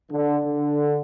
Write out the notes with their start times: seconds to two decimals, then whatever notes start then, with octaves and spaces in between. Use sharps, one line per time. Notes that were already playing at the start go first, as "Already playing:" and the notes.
0.11 D3
0.44 D3